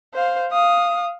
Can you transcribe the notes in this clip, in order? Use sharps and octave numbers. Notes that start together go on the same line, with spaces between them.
C5 F5
F5 D#6